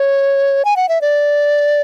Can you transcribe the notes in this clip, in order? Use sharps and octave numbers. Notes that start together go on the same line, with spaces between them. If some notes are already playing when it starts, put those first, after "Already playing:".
Already playing: C#5
G#5
F#5
E5
D5